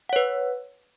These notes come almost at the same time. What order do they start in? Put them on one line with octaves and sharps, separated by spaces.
F#5 C#5 B4